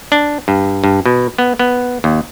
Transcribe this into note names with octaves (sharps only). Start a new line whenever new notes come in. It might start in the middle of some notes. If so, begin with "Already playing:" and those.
D4
G2
G2
B2
B3
B3
D#2